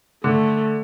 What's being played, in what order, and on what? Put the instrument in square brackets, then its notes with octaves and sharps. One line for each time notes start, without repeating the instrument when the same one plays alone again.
[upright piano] D3 [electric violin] A3